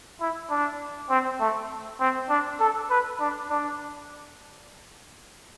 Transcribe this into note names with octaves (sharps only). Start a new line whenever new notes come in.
E4
D4
C4
A3
C4
D4
A4
B4
D4
D4